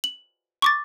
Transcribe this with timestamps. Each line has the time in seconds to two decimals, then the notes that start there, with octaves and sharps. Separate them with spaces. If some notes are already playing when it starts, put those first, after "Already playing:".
0.04 F#7
0.62 C#6 D6 A6